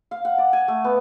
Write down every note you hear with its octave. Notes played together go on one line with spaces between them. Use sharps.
F5
F#5
D5
G#5
A3
B3